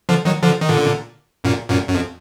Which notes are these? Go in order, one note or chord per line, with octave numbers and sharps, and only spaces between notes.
D3 F3
D#3 F#3
D3 F3
D#3
A#2 D3
F#2 A#2
F#2 A#2
F#2
F2